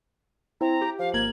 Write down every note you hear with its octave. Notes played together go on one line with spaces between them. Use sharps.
C4 E4 A#5
G4
F3 F5
G#1 A#3 G#6 F#7